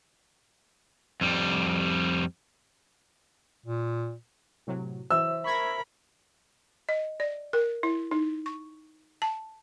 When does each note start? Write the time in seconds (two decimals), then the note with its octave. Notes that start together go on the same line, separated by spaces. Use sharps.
1.21 F2 G3
3.66 A#2
4.67 A2 C3 F#3
5.11 E3 F#3 C5 E5 E6
5.45 A#4 B5 C#6 G#6 A#6
6.89 D#5
7.20 D5
7.53 A#4
7.83 E4
8.11 D#4
8.46 C#6
9.22 A5